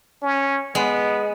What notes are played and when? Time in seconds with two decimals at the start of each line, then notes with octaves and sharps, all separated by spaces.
0.22 C#4
0.75 G#3 B3